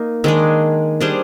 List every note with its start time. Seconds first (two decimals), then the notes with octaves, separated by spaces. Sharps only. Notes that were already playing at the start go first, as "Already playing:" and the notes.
Already playing: A#3 D#4
0.24 D#3 G#3 D4 G#4
1.00 G3 D4 G#4 C5